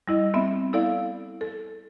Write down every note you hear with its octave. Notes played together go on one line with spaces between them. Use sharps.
G3 E4 D#5
B3 C4 E5
E4 A4 D5 F5
A4